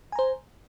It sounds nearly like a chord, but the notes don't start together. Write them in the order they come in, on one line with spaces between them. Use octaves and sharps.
G#5 A#5 C5